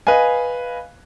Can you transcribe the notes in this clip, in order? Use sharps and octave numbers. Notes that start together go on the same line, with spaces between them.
B4 D#5 F5 G#5